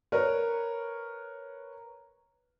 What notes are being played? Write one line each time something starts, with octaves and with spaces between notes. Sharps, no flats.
A#4 B4 C#5